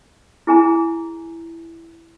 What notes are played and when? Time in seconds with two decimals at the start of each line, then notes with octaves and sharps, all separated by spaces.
0.47 E4 G#4 G#5 A#5